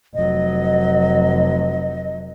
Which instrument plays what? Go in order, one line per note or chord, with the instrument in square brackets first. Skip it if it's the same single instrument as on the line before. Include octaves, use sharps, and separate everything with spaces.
[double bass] F1 F#3 [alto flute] D#5